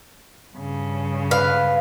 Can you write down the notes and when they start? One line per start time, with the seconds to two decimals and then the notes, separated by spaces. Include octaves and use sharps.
0.56 G2 C#3
1.31 B4 F5